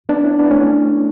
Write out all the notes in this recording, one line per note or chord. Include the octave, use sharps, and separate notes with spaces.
B3 D4
C#4 E4
B3 D4
A3 C#4